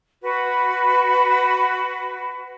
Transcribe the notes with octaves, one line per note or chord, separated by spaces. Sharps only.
F#4 B4